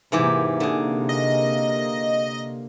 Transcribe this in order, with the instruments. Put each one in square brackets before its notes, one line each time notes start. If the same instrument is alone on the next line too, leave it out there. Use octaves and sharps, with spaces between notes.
[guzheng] G#2 E3 G4 [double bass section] C3 A#3
[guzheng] D3 G#4
[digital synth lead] D#5